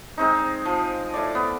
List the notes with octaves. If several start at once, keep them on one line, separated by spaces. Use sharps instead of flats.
G#3 C4 D#4
F3
A2 D5
B3